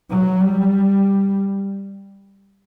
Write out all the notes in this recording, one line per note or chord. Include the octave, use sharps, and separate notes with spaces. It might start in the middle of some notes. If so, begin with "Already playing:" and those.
F#3
G3